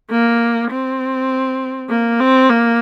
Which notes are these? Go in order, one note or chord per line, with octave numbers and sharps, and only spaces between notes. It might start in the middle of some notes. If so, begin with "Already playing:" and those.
A#3
C4
A#3
C4
A#3